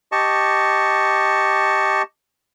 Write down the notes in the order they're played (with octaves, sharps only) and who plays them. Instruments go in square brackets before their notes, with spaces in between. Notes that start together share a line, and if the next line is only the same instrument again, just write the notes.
[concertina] G4 D#5 A5 C#6